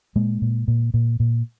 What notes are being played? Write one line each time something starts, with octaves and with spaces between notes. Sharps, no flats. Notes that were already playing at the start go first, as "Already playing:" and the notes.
A#2 G#3 A#3
A#2
A#2
A#2
A#2